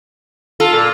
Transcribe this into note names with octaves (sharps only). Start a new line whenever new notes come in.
F4 A4
A#2